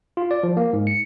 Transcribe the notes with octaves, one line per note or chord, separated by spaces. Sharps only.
F4
D5
F3
A#3
G#2
C#7